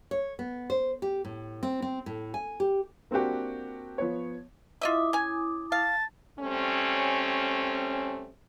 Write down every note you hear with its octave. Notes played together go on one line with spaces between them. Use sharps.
C#5
B3
C5
G4
A2
C4
C4
A2
G#5
G4
A#3 C4 D4 F#4 G4
F3 B3 C#5
E4 F4 D#5 E5 D6 D#6
C#4 G#5
F5 A5
G3 A3 C4 C#4